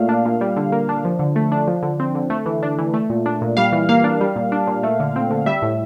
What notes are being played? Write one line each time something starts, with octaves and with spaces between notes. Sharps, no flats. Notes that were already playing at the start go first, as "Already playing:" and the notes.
Already playing: A#2 A3 F5
D4
A#2
G3
D3
A#3
D4
F3
D3
A3
D4
F3
D3
C4
D3
A3
E3
D4
E3
A3
A#2
D4
A#2
G3 F5
E3
A#3 F5
D4
G3
A#2
D4
A#2
A3
D3
C4
D3
G3 E5
A2